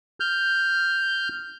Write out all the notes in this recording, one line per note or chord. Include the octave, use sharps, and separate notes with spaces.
F6 G6